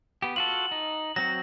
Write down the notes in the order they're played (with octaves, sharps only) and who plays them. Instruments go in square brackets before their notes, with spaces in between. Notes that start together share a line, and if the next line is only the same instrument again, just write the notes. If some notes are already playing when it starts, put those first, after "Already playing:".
[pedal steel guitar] B3 G4
[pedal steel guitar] F4 F#4 A4 [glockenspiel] F#7
[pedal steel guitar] D#4
[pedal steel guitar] F#3 C4 F#4 [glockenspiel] A#6